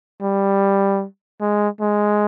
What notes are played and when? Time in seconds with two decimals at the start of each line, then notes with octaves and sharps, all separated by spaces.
0.21 G3
1.40 G#3
1.80 G#3